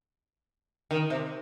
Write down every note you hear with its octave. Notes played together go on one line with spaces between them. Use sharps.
D#3
C3